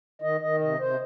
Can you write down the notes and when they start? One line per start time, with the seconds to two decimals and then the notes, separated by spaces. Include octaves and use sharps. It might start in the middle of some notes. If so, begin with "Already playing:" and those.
0.22 D#3 D#5
0.41 D#3 D#5
0.60 C3 D#5
0.80 C3 C5